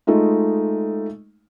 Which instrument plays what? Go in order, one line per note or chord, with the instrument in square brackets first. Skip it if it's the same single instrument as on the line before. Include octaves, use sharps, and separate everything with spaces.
[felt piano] G#3 A3 D#4 F4